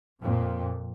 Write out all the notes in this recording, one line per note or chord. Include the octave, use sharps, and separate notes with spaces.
F2 A#2